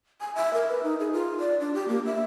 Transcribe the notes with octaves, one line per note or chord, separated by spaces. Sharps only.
G#5
E5
A#4
B4
D#4
G#4
F4
D5
D4
G4
A#3
E5